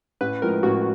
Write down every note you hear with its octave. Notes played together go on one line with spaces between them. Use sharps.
A1 B4
A2 F3 G#3 A#4
A1 F#4